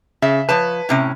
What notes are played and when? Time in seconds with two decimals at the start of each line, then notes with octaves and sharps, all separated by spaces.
0.22 C#3 E5
0.49 F3 B4 C#5 A5
0.89 A2 C3 C#4